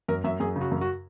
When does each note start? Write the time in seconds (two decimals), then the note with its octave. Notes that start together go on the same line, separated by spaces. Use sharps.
0.08 F#2 A#4
0.24 F#2 E5
0.40 F#2 G#4
0.56 C#3
0.61 F#4
0.71 F#2
0.81 F#4